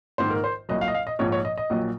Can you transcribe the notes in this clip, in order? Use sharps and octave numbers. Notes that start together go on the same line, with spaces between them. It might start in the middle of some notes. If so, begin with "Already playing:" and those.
A#1 G#2 D#3 C5
A#4
C5
C2 A#2 F#3 D#5
F5
D#5
F5
D#5
A#1 G#2 F3 C#5
C#5
D#5
D#5
A#1 A#2 F#3